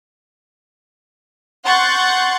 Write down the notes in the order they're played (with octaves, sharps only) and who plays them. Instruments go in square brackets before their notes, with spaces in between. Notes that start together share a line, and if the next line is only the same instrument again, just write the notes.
[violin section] F#5 C6 C#6 F#6 G6 A6